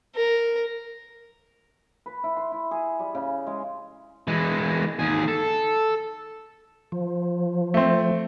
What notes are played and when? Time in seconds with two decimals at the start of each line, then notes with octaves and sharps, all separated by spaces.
0.15 A#4
2.06 B4
2.24 E4
2.36 C6
2.52 E4
2.71 G#4
3.00 G3
3.15 C#3
3.47 G#3
4.28 E3 G#3
4.99 D#2 G#4
5.28 A4
6.92 F3
7.74 A3 C4